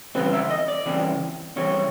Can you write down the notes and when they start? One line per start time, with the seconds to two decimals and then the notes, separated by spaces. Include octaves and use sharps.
0.15 C#3 E3 G3 C4 B4
0.33 E5
0.50 D#5
0.68 D5
0.86 C#3 E3 G3 C4
1.56 C#3 E3 G3 C4 C#5